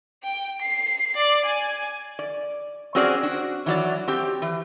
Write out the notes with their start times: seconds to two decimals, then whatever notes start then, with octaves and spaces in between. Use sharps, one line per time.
0.23 G5
0.61 C7
1.16 D5
1.45 G#5
2.19 D5
2.95 C4 C#4 F#4 G#4 D5
3.23 D4 F#4
3.66 E3 F#3 D5
4.08 C4 G4
4.42 E3